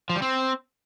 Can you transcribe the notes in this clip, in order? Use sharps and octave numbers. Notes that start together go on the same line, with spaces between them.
F3
G3
C4